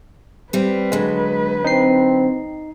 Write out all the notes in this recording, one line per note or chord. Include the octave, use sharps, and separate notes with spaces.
G3 C4 B4
D3 F#3 G#3
C4 D#4 C7